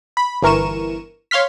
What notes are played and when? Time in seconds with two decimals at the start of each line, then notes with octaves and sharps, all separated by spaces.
0.17 B5
0.42 G1 E3 A#4 C#6 D#7 E7
1.31 C#5 F5 C6 F6 B6